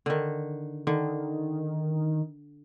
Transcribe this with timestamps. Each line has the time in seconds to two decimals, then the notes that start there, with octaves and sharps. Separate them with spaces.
0.06 D3 D#3
0.87 D3 D#3